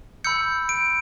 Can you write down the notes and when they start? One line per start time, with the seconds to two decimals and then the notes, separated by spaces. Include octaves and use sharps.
0.24 B5 E6 G6 C#7
0.69 D7